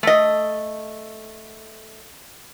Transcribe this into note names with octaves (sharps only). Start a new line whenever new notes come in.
A3 D#5